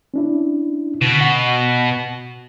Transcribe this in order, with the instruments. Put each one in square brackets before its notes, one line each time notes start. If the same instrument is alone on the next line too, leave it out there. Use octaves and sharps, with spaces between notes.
[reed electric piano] C#4 D4 E4
[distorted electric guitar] B2 [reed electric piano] D3
[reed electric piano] F#5